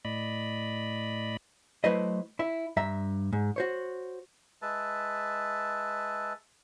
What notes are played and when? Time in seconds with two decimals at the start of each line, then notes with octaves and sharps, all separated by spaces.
0.05 A2 D5 D#5 B5
1.84 F#3 A3 E4 B4 C5 D#5
2.39 E4 E5
2.77 G2 E5 A#5
3.33 G#2
3.56 F#4 C5 C#5
4.62 G#3 B4 E5 A5